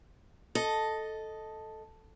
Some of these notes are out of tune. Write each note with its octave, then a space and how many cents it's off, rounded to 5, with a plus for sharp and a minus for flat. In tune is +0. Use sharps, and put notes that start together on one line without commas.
A4 +0 D#5 +0